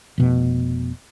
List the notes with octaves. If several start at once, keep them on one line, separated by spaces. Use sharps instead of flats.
F1 B2